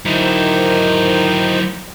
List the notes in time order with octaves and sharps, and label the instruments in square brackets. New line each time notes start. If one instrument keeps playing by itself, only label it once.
[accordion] D#3 D#4 C5 [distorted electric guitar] F#3 E4